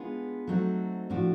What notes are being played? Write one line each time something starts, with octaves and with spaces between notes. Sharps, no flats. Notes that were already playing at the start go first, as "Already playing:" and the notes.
Already playing: G#3 B3 D4 F4 G#4
F#3 A3 C4 D#4 F#4
A2 F3 A3 D4 F#4